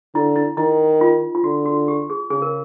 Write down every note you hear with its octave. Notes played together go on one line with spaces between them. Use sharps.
D3 E4
E4
D#3 E4
F4
F4
D3 F#4
F#4
G4
G#4
C#3 G#4
A#4